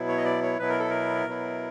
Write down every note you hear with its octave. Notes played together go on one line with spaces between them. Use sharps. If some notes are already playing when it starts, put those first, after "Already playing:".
Already playing: B2 F#3 B3 E4
C#5
D#5
D5
C#5
B2 F#3 B3 E4 B4
A#4
A4
A#4
B2 F#3 B3 E4